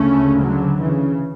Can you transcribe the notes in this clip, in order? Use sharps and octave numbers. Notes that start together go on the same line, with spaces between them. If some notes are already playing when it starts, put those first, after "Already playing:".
Already playing: D2 C#3 A3 C#4
D3 F#3
C#3 E3